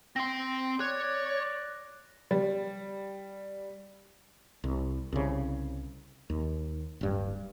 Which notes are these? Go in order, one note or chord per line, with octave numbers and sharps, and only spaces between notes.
C4 C6 A#6
C#5 D5 F#6
G3
C2
C2 C#3
D#2
D1 G2